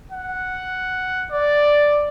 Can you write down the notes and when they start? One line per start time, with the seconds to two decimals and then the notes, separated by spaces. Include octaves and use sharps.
0.11 F#5
1.31 D5